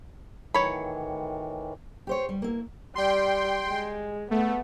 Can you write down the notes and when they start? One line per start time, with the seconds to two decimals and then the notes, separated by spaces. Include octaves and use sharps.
0.54 A2 D#3 E3 F#3 C#5 B5
2.07 G4 C5 C#5
2.29 G3
2.42 A#3 E4
2.95 G3 G5 C6
3.67 G#3
4.31 A3 B3